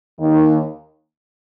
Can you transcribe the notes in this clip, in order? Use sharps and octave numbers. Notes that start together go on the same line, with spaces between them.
D#2 D#3